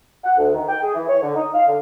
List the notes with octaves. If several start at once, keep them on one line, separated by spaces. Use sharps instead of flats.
F#5
D2
D#3
G5
G#4
E3
C#5
D3
D#4
F5
D3